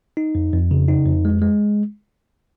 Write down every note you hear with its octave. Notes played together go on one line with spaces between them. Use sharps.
D#4
F2
F2
C#3
D#4
F2
G#3
G#3